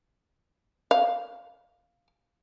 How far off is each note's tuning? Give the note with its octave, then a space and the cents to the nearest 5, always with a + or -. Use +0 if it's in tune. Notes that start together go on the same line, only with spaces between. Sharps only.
F5 +0